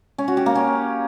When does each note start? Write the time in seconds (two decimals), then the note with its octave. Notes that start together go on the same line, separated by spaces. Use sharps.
0.18 C#4
0.28 F#4
0.37 G4
0.46 A#3
0.55 C#4